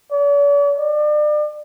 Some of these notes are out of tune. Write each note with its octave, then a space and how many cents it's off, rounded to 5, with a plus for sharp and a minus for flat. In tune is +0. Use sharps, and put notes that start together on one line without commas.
D5 -45
D5 +35